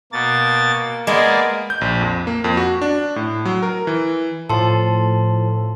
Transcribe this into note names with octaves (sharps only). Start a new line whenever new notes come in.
B2 A#3 A6
G#3 A#3 B3 G#4 D5
G6
A#1
F2
A#3
F2
F#4
D4
A2
F#3
A#4
E3
A2 F3 A4 A5 C6